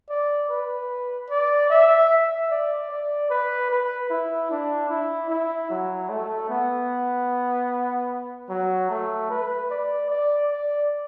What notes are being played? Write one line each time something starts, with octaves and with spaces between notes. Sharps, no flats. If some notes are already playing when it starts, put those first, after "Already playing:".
D5
B4
D5
E5
E5
D5
D5
B4
B4
E4
D4
E4
E4
F#3
A3
B3
F#3
A3
B4
D5
D5
D5